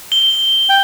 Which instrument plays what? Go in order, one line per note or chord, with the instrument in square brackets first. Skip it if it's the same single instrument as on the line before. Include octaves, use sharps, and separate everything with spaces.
[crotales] G7
[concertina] G5